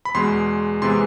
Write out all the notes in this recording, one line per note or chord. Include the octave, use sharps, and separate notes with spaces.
B5
E2 B2 G#3 C6
C3 E3 G#3 B3 C6